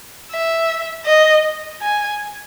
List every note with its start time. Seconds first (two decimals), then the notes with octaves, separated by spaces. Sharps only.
0.31 E5
1.06 D#5
1.82 G#5